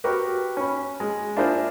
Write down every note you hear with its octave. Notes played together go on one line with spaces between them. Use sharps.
F#4 G4 A#4 B4
C#4 B5
G#3
D4 E4 F4 G#4 A#4 C5